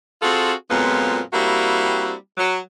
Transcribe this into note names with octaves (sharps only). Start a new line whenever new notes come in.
C4 F4 F#4 G#4 A4
F2 A#2 F3 F#3 G#3 B3
G3 A#3 C4 E4 F#4
F#3